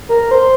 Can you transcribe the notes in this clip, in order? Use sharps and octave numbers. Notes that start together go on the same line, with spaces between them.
A#4
C5